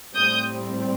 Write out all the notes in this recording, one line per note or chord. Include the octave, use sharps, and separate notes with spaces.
A2 G3 C4 D#6 G6